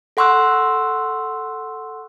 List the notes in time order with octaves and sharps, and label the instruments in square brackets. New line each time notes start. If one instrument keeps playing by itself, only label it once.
[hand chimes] A4 F#5 C6 C#6 E6 F#6